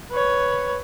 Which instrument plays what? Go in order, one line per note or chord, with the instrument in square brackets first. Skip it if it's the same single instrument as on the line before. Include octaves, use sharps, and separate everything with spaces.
[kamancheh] B4 C#5